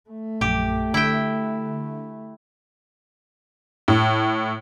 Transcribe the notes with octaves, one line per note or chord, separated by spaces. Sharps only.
A3
A#1 F#2 G4 D6
D3 E4 G5
A2